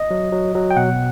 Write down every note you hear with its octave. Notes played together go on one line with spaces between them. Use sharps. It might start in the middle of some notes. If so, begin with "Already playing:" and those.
Already playing: D#5
F#3
F#3
F#3
G5
B2 F#5